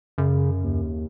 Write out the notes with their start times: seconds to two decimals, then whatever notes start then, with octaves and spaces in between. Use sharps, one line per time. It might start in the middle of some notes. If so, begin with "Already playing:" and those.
0.18 F#2 C#3
0.64 D#2